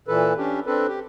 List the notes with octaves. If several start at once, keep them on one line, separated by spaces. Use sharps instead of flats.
A#2 E3 A4 B4
C#4 D4 G4
C4 D4 A4 B4
G4